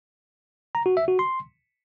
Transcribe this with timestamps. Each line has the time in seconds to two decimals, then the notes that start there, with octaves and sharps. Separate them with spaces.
0.75 A#5
0.86 F#4
0.97 E5
1.08 F#4
1.19 C6